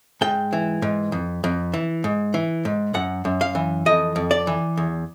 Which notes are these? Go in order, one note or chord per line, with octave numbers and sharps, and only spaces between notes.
G#2 G5
E3
G#2
F2
F2
E3
G#2
E3
G#2
F#2 F#5
F#2
F5
E3
F2 D#5
F2
D5
E3
E2